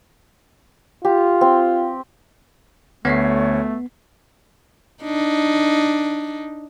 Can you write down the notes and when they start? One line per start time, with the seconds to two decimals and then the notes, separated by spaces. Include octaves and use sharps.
1.05 F4 G4
1.41 C4
3.05 D2 A3 B3 C#5 B6 C7
5.03 D4 D#4